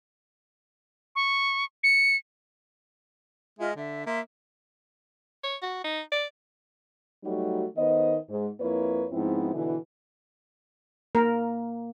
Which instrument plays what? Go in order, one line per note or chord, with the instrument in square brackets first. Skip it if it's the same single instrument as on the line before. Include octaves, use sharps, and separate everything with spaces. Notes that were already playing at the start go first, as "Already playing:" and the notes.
[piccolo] C#6
C#7
[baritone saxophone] G#3 [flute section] F4 D#5 E5
[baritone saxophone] D3 [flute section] E5
[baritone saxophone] A#3 [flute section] E5 C6
[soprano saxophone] C#5
F#4
D#4
D5
[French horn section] F#3 G3 A3 D#4 F#4
D#3 B3 C5 D#5
G#2
F2 A#3 E4 B4 C#5
G#2 F3 B3 C4 E4
B2 D3 E3
[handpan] A#3 [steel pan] A#4